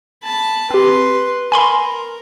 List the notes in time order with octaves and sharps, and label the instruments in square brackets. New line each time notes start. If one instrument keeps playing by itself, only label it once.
[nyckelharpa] A5 B5
[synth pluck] C4 G4 [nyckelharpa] B4 C6
[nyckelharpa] A#4 [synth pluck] G#5 B5 C6